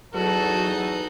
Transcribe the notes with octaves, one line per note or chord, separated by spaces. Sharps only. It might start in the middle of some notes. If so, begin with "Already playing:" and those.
E2 F#3 D#4 F#4 A4